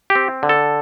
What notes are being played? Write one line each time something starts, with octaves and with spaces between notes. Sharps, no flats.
G4
C4
D3
A4